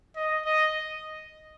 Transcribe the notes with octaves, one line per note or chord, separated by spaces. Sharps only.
D#5
D#5